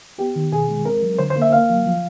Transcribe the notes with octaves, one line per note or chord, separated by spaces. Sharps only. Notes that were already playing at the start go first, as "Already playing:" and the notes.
B3 G4
D#3
B2 G#4
G#3
C4 A#4
F#3
D3 C5
C5
A#3
E5
A#3 F5
F#3
F3